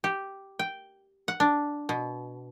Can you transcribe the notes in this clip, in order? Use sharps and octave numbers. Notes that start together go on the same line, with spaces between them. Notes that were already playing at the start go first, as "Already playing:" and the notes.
G4
G5
F#5
D4
B2